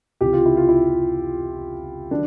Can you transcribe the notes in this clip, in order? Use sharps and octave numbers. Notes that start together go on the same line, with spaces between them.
C#2 C3 E3 G4
F4
E4
F4
E4
D#3 F#3 D4